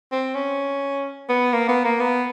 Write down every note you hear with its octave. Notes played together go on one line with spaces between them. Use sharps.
C4
C#4
B3
A#3
B3
A#3
B3